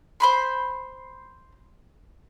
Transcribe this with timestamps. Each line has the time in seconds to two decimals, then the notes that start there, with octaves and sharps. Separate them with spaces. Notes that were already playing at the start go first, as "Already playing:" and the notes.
0.20 C5 B5 C6